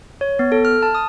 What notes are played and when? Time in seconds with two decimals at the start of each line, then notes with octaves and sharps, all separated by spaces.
0.21 C#5
0.39 B3
0.52 A4
0.65 F6
0.83 A5
0.95 D#6